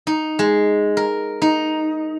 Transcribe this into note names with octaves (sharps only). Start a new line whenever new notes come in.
D#4
G#3
A#4
D#4